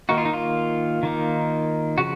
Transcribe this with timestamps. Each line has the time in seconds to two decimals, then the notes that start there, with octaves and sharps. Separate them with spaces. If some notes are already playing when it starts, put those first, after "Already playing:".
0.09 D#3 A#3 D#4 F#4
0.18 F4
0.25 D#4
0.33 F4
1.03 D#3 A#3 D#4
1.98 C#3 F3 F#4